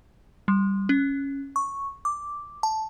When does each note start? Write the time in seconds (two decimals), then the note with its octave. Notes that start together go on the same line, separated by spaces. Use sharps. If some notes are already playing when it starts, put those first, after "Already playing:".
0.48 G3
0.89 C#4
1.56 C#6
2.05 D6
2.63 A5